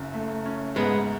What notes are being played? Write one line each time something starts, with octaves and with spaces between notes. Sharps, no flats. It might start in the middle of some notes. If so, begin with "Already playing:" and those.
Already playing: F#1 F#2
A3
C#4
G#2 G#3 B3